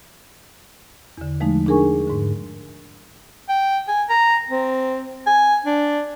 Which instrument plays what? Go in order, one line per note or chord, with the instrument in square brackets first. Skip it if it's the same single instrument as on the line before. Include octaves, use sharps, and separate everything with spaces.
[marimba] E2 D3
F3 G#3 A3 D#4
D4 D#4 G#4 A#4 G#5 C#6
G#2 D3
[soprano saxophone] G5
G#5
A#5
C4
G#5
D4